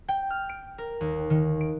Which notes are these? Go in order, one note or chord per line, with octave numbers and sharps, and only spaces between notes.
G5
F6
D7
A#4
D#2
D#3
D7